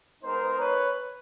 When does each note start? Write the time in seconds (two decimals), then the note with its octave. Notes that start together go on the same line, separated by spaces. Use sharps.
0.23 G#3 B3 D#4 A#4 C5
0.57 B4 C#5